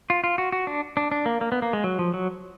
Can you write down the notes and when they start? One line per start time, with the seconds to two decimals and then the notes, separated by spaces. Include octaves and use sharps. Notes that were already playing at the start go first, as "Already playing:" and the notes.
0.10 F4
0.24 F4
0.38 F#4
0.52 F#4
0.67 D4
0.97 D4
1.11 D4
1.26 A#3
1.41 A#3
1.52 B3
1.62 A#3
1.73 G#3
1.84 F#3
1.99 F3
2.14 F#3